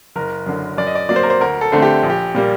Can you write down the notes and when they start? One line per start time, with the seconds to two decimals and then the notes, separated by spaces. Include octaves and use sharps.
0.16 F#1 A#4
0.46 F#2 D3
0.78 F#2 D5
0.87 D#5
0.95 D5
1.09 F#3 A#3 D5
1.16 C5
1.23 A#4
1.30 C5
1.41 D2 A#4
1.61 A4
1.72 D3 A3 C4
1.82 G4
2.03 A#1
2.10 G4
2.34 A#2 G3 A#3